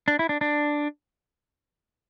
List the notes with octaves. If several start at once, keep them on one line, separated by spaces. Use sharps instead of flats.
D4
E4
D4
D4